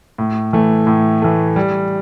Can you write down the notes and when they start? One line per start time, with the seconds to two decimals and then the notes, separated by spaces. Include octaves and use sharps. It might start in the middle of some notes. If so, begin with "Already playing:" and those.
0.18 A2
0.53 E3 A3
0.87 A2
1.22 E3 A3
1.56 G3